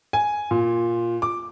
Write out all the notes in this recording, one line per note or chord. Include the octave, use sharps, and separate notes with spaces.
G#5
A#2
D6